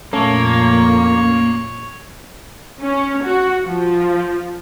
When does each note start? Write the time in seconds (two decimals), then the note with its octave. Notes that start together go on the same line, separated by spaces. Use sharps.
0.13 F2 A#2 A3 A#3 C#4 A4 C#5
2.82 C#4
3.24 F#4
3.65 F3